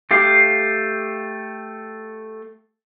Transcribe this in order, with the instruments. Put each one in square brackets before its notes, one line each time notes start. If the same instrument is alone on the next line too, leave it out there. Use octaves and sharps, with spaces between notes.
[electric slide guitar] A3 G4 F5